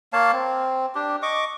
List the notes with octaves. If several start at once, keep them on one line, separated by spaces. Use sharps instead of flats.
A#3 C#5 F5 A5
C4
D4 G4
D#5 C#6 D6